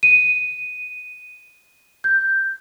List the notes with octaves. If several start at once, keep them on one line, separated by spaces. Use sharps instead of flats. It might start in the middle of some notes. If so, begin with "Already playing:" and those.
D#7
G6